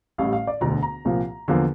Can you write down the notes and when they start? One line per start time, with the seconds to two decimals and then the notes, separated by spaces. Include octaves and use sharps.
0.18 A1 A2 G3 F5
0.33 F5
0.47 D5
0.61 E1 D2 D3 A#5
0.83 A#5
1.05 C2 A#2 F3 A#3
1.48 E2 D3 F3 A#3